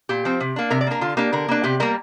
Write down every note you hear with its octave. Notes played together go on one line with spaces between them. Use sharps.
A#2 G4
F3 C4
C3
A#3 D4
C3 A#4
D5
A#3 D4 A#4
D3 F4
A#3 D4 G4
D3 A#4
A#3 D4
C3 G4
G3 A#3 A#4